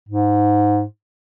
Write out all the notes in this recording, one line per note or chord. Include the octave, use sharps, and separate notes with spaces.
G#2